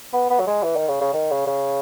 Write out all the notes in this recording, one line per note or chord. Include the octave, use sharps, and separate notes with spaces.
B3
B3
F#3
G#3
E3
D#3
C#3
C#3
D#3
C#3
C#3